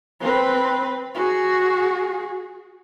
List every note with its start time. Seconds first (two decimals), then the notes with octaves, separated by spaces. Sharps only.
0.20 C4 B4
1.15 F#4 G#4